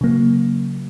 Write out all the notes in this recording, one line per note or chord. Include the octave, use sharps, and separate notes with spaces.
C#3 F#3 A#3